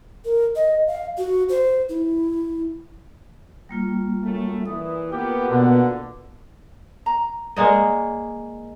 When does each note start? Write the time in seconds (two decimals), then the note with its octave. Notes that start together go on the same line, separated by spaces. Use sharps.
0.25 A#4
0.56 D#5
0.87 F5
1.18 F#4
1.49 C5
1.89 E4
3.69 G3 A#3 F4
4.23 F#2 A3
4.66 A#2 E3 D#6
5.12 A#3 B3 F4 G4
5.50 B2 D3
7.06 A#5
7.56 G#3 A#3 D5 D#5 F#5